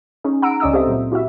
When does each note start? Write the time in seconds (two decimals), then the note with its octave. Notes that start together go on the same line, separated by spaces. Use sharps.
0.24 C#4 D#4 G#4
0.42 F#5 A#5 E6 D7
0.60 C#2 C#4 D5 D#5 D#6 E6
0.73 C4 G4 A4 C5 E5
0.87 A#2 F#3
1.12 E4 F#4 G4 E5